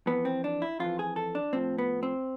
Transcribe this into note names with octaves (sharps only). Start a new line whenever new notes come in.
F2 E3 B3
C4
D4
E4
F2 E3 F4
G#4
A4
D4
A2 F3 C4
B3
C4